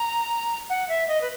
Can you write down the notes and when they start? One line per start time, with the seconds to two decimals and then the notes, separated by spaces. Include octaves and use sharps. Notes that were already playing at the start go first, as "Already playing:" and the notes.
Already playing: A#5
0.70 F#5
0.89 E5
1.08 D#5
1.21 B4